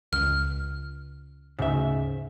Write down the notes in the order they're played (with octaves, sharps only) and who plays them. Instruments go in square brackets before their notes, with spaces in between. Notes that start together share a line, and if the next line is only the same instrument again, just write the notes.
[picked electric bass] C#2 [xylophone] F6
[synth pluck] D2 G#2 [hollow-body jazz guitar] C#3 E5